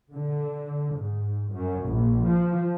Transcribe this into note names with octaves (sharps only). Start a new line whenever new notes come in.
D3
G#2
F#2
A#1
F3